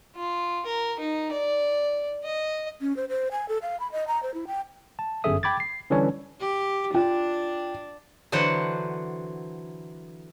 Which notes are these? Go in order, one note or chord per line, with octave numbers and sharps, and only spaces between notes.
F4
A#4
D#4
D5
D#5
C#4
C5
C5
G#5
A4
F5
B5
D#5
A#5
C5
E4
G5
A5
G1 F#2 G#4 A4 E5 D#6
G5 B5 D6 G#6 A6
C7
D3 E3 G3 C#4 D4 C#5
G4
D4 F4 G5
D3 E3 F#3 C5 F#5